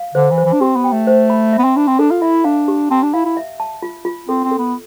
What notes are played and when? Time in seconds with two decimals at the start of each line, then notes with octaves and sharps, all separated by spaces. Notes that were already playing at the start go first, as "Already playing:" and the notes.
Already playing: F5
0.15 D3 C5
0.31 E3
0.38 C5
0.45 E3
0.53 D4
0.61 C4 G4
0.76 B3
0.84 G5
0.92 A3
1.07 C5
1.30 B5
1.53 E5
1.58 B3
1.64 C4
1.76 D4 B5
1.87 C4
1.99 D4 A4
2.11 F4
2.21 E4 E5
2.44 D4 F5
2.68 G4
2.91 C4 A5
3.03 D4
3.14 E4 F5
3.25 E4
3.37 E5
3.60 A5
3.82 F4
4.05 F4
4.28 C4 A4
4.44 C4
4.51 A4
4.59 B3